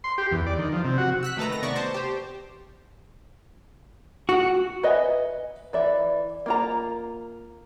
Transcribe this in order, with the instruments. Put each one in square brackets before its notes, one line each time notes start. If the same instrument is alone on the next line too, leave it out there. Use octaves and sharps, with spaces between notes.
[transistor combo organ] C6
G4
E2
D5
D#3
F3
C3
F#4
[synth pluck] E6 F#6 B6
D#3 A3 A4 B4 A#5
D#3 A#6
C3 B3 D5 C#6 A#6
C5 A5
G4 C5
[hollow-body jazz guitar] F#4
[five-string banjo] B4 D#5 E5 F#5 G#5
E3 D5 E5
A#3 F4 A#5